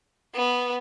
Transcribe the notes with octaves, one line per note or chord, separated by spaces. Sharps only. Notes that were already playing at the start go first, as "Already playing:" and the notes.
B3